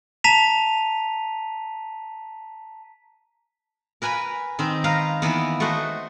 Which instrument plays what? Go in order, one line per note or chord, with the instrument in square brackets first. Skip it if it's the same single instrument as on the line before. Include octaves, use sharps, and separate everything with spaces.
[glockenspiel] A5 A#5 B6 D#7 F7
[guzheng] A#4 B4 G#5 A#5 B5
D#3 C4
A#4 B4 F5 A#5
D#3 E3 A#3 B3
A3 F#4 C5 D#5 F#5